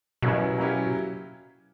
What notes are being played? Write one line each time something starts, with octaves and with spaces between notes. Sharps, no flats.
B2 F#3 A#3 C#4 E4 G4
F#3 A#3 C#4 E4 G4